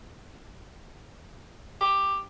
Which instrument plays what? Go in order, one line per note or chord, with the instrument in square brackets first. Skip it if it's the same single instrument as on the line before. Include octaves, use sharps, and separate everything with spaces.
[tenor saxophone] G4